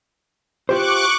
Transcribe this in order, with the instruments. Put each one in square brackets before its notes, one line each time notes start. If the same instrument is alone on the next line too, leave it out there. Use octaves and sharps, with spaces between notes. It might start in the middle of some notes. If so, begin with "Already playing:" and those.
[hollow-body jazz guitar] F4 G4 C5 [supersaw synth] C#6 D6 F#6